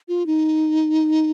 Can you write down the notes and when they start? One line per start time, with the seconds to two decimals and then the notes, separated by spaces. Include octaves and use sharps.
0.08 F4
0.26 D#4